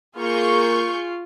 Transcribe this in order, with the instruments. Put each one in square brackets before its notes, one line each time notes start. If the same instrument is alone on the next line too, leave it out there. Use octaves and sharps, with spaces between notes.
[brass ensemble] A#3 [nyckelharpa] F4 [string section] G#4 C#6 G6